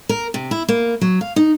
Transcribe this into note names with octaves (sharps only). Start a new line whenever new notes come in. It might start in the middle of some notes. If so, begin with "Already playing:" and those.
A#4
C3
E4
A#3
F#3
F5
D#4